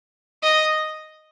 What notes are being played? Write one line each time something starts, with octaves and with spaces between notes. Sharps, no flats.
D#5